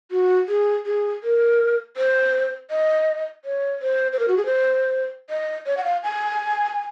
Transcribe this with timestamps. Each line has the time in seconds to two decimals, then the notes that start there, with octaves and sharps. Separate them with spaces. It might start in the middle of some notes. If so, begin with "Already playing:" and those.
0.11 F#4
0.49 G#4
0.86 G#4
1.23 A#4
1.97 C5
2.70 D#5
3.45 C#5
3.82 C5
4.13 C5
4.19 A#4
4.28 F#4
4.37 G#4
4.46 C5
5.30 D#5
5.66 C#5
5.77 F#5
5.84 F5
6.03 G#5